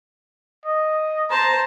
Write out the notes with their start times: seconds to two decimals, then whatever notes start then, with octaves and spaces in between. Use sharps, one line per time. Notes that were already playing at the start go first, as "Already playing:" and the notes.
0.65 D#5
1.30 C5 A5 A#5